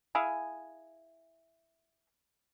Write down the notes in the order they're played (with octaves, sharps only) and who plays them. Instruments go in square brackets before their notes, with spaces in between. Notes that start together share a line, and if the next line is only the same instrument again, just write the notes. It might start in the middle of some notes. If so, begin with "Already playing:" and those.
[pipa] E4 G#4 F5 G#5